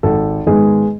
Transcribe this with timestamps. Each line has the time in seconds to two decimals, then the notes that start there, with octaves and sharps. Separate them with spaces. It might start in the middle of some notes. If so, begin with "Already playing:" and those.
0.03 G#1 A4
0.46 G#2 D#3 G#3 B3 G#4